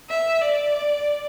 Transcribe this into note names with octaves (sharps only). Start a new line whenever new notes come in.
E5
D5